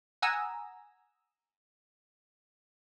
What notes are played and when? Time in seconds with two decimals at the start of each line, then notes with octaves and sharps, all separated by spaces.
0.22 F#5 G#5 A#5 D#6 E6